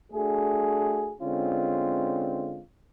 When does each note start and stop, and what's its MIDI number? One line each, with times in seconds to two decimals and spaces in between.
0.13 1.13 57
0.13 1.13 62
0.13 1.13 66
0.13 1.13 68
1.21 2.61 50
1.21 2.61 56
1.21 2.61 60
1.21 2.61 61
1.21 2.61 65